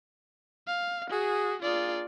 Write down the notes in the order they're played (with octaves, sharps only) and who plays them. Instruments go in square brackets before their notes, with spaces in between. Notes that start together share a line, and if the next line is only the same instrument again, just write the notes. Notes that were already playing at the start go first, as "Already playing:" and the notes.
[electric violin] F5
[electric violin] F#4 [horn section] G#4
[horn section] A#3 D4 G#4 [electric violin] F4 D5